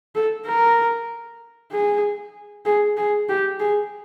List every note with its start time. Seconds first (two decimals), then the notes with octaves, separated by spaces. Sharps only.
0.15 A4
0.46 A#4
1.72 G#4
2.65 G#4
2.97 G#4
3.29 G4
3.60 G#4